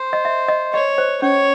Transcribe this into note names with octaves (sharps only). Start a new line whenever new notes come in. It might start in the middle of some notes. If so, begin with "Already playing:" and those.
Already playing: C5
D#5
E5
D#5
C#5 D#5
C5
C#4 C#5